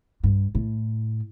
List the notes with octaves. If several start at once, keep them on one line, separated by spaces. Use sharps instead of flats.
G2
A2